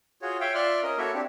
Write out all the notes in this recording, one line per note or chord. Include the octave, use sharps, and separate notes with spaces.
F4 F#4 G#4 C#5
C#5 E5 F5 G5
F4 D5 E5 C6 F6 F#6
C#4 A#4 D#5
A#3 E4 F#4 A4 C#5 E5
C4 D4 G4